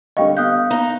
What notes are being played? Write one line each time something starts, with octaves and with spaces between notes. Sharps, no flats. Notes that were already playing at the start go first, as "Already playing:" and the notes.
D3 G3 D#5 F5 G5 C#6
B3 F5 D#6 F#6 G6
D#4